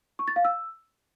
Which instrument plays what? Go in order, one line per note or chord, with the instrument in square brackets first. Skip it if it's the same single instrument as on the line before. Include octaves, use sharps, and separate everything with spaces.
[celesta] C#6
A6
F5
E6